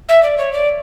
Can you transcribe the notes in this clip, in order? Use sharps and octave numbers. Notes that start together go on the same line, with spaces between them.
E5
D5
C#5
D5